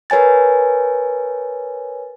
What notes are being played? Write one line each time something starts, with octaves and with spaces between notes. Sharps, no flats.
A#4 B4 C#5 G#5 A6